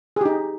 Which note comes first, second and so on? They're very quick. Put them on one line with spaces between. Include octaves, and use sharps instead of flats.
G#4 G4 D#4